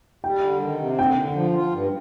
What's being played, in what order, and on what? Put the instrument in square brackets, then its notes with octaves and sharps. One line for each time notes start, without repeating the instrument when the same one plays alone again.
[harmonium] G3 [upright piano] G5
[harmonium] D3
D#3
C3
[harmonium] D3 [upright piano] G5
[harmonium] D3
F3
F4
G2